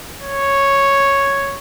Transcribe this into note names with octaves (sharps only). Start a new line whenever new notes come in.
C#5